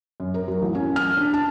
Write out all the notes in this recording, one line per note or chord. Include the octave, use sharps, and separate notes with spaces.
F#2
A#4
F#3
A1
C#4
F6
D4
A5